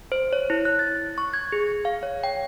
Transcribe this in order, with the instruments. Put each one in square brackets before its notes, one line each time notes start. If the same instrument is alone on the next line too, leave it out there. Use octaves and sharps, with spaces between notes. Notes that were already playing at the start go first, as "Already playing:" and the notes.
[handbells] C5
C#5
E4
F#6
A6
C#6
G#6
G#4
F5
C#5
G5